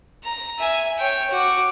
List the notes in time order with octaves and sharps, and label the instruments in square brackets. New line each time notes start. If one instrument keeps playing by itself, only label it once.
[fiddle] A#5
E5 G#5
C#5 G5
F#4 D6